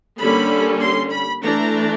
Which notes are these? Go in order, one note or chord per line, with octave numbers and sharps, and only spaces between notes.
D3 G3 A#3 C#4 B5
C6
B5
E3 A3 D4 A#5